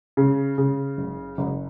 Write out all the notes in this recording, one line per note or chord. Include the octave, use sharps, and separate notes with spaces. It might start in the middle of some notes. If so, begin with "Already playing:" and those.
C#3
C#3
F#1
F#1